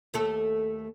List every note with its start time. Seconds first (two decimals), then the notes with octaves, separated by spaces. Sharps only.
0.14 D#2 A3 A4